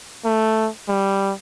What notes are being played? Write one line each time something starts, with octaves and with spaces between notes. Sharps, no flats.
A3
G3